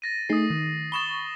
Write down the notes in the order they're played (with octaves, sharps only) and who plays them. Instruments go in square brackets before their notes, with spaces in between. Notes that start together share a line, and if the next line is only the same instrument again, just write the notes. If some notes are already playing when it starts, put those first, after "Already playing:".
[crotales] A6 A#6 D#7
[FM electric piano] A3 D#4 G#4 [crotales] D#6 C7
[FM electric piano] D#3
[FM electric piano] B5 C#6 D#6 [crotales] A6 E7 G7